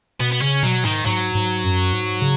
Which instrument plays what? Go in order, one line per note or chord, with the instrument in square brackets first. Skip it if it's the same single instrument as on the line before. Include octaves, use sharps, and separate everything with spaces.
[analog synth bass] B2 [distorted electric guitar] B3
[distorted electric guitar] B3
[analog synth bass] C#3 [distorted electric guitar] C#4
[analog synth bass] B2 [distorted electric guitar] F#3
[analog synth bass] G#2 [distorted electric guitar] D#3
[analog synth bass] G#2 [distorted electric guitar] F#3
[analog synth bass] G#2
F#2
G#2
C#3